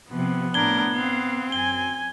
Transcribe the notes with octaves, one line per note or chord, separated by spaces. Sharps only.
C3 F3 B3
A2 D4 A#4 G#6 G7
C4 F5
F#2 G#5 G7